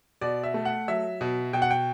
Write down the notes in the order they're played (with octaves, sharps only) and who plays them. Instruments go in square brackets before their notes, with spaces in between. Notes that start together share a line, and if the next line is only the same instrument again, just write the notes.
[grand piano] B2 D5
E5
A3
F#5
F#3 E5
B2
B2 G5
F#5
G5